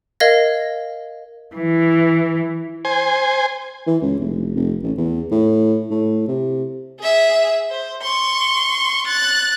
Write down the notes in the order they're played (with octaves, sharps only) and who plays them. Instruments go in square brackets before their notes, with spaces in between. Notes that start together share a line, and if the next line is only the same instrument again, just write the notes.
[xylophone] A#4 D#5 F5 G#6 A#6
[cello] E3
[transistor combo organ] C5 G#5
[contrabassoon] E3
C#2
F1
F1
A1
E2
A2
A2
C3
[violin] G#4 E5
C5
C6 C#6
F#6 A6